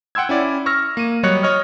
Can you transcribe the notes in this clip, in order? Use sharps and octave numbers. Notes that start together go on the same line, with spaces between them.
F#5 G5 C6 E6 G#6
C#4 E4 D5
C#6 E6 F6 A#6
A#3 D#7
F#3 G3 C#5 D#5 F#6 C#7
C#5 D#5 F6